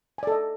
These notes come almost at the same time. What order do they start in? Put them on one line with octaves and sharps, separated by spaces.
G#5 D5 A4 D#5